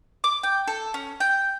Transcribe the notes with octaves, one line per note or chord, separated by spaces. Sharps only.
D6
G5
A4
C#4
G5